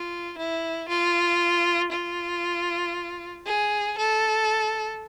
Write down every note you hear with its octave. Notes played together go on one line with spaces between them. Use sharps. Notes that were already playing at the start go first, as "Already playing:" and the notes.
Already playing: F4
E4
F4
F4
G#4
A4